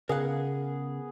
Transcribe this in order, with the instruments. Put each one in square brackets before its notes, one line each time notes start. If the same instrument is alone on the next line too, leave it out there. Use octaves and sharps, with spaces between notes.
[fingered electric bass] C#3 [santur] B3 G#4 [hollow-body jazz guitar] A#4 F5 F#5